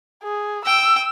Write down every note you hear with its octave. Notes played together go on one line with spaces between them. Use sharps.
G#4
G5 E6